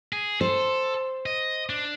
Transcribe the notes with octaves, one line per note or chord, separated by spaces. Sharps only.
G#4
A4 C5
D#5
D4